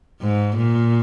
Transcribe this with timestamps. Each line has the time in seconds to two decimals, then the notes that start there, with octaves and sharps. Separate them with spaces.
0.21 G#2
0.57 A#2